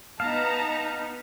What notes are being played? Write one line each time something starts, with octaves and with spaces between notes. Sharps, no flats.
B3 D#4 F5 A5 A#5